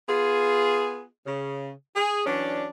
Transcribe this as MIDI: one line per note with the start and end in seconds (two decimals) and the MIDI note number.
0.09 1.07 59
0.09 1.07 65
0.09 1.07 68
1.27 1.72 49
1.96 2.24 68
2.26 2.68 52
2.26 2.68 54
2.26 2.68 61
2.26 2.68 62